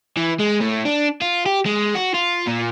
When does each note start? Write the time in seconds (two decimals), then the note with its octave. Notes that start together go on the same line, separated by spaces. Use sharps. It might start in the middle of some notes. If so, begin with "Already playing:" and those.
0.17 E3
0.40 G#3
0.61 A2
0.85 D4
1.21 F4
1.46 G4
1.65 G#3
1.95 F#4
2.14 F4
2.47 A#2